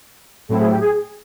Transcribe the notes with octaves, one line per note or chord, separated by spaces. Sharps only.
A2 F#3 A3 C4 E4 A4
G#4
G4
G#4